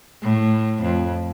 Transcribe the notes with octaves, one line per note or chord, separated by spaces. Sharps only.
A2
F2